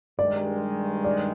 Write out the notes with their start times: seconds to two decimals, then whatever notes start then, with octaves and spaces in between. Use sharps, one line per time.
0.19 G2 D#3 G#3 D5
1.04 D5